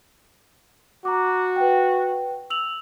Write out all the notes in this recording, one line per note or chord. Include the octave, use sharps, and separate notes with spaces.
F#4 A#5 D6
B4 G5
E6 F7 F#7